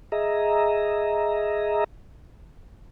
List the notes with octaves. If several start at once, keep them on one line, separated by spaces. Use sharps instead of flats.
G#4 D#5 E5 A#5